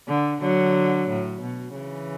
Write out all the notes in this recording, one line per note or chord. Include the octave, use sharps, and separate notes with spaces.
D3
D3 F#3
A2
B2
C#3 E3